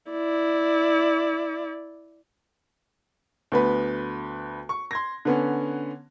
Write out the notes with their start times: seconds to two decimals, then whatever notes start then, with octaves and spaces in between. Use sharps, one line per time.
0.11 E4 D5
3.52 D2 B3 B4
4.69 C#6
4.91 C6 G#6 A#6
5.25 D3 B3 C#4